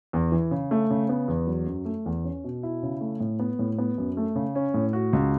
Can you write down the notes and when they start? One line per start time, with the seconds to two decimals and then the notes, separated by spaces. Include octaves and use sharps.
0.13 E2
0.32 E3
0.51 C#3
0.71 A3
0.90 C#3
1.09 B3
1.28 E2
1.47 F#3
1.67 F#2
1.85 A3
2.06 E2
2.24 C#4
2.44 B2
2.63 E4
2.83 C#3
3.01 A3
3.20 A2
3.39 B3
3.59 A2
3.78 B3
3.98 F#2
4.17 A3
4.35 C#3
4.55 C#4
4.74 A2
4.93 F#4
5.13 C#2